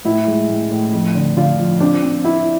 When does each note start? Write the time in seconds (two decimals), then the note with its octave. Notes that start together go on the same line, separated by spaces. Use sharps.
0.05 A2 E4
0.27 G#3
0.49 A2
0.71 A2
0.93 F2
1.15 D3
1.37 D3 F4
1.59 F3
1.80 C4 D4
2.03 C4
2.24 C4 E4